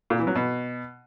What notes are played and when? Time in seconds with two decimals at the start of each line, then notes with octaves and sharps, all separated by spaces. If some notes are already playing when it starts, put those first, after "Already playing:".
0.10 A#2
0.19 E3
0.27 F#3
0.35 B2